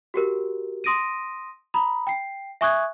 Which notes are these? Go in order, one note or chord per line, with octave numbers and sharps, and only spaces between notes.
F#4 G4 A#4
C6 D#6 A#6 D7 D#7
A#5 B5 D#6
G5 C7
E5 G#5 C#6 D#6 F#6 G#6